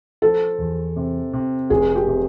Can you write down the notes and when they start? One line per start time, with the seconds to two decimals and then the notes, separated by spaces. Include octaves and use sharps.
0.22 F3 A4
0.59 E2
0.96 C3
1.33 C3
1.70 F1 G#4
1.95 G4
2.08 C3